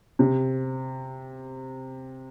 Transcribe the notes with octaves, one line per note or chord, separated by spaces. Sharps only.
C3